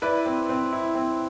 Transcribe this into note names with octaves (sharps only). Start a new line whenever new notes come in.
E4 B4 D5
C4
C4
E4
C4